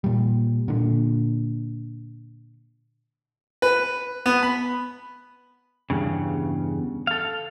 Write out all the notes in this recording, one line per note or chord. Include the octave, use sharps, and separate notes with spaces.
A#2 G3
A#2 D3
B4
B3
B5
E2 G2 C#3
A4 F5